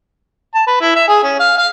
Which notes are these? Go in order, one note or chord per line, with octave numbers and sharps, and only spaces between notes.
A5
B4
E4
E5
G#4
C#4
F5
F5